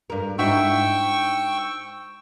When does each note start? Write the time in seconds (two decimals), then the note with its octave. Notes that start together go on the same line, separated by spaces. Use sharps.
0.10 G2 A#4
0.39 G#2 E4 F#4 G5 C#6 E6